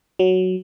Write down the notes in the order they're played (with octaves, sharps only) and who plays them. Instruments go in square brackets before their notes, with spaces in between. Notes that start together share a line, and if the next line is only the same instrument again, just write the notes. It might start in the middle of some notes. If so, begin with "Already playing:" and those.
[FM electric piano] F#3